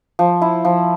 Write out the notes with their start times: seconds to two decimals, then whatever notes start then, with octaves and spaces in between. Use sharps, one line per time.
0.19 F3
0.42 E4
0.65 F3